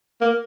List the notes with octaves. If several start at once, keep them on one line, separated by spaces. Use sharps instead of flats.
A#3